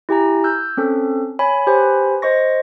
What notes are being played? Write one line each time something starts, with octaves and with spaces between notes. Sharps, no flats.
E4 G4 G#5 A#5
E6 F#6 G6
C4 C#4 A4
C#5 G#5 B5
G4 B4 C5 G#5 B5
C5 D#5 C#6 A#6